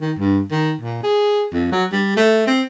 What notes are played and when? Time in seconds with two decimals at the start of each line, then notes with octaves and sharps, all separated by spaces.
0.01 D#3
0.19 G2
0.51 D#3
0.81 A#2
1.03 G#4
1.53 F2
1.72 F#3
1.92 G3
2.17 A3
2.47 C4